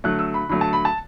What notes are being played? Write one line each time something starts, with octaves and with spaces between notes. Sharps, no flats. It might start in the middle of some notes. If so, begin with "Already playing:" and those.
D3 F#3 A3 F#6
E6
B5
D3 F#3 A3 B5
A5
B5
A5